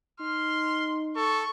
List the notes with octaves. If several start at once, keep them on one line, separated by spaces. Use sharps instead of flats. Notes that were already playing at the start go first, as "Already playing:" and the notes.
D#4 C6 F6
A4 C#6